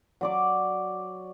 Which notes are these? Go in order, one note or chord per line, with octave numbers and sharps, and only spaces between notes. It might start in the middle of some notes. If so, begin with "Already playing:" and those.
F#3 D5 D6